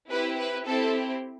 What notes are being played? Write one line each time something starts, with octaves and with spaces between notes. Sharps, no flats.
C4 E4 G4 B4
B4
C4 E4 G4 A4